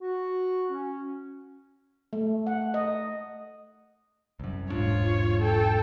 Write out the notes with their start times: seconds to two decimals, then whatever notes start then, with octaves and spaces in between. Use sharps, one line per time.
0.02 F#4
0.70 C#4
2.13 A3
2.47 F#5
2.74 D#5
4.40 C2 F#2
4.70 E1 G#2 D4 F4 C#5
5.42 A4 G5